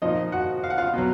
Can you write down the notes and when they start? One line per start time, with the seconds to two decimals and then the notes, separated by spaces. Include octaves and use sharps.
0.02 A#2 F3 D#4 D#5
0.32 F#4 F#5
0.64 F5
0.70 F#5
0.78 F4 F5
0.93 B2 F#3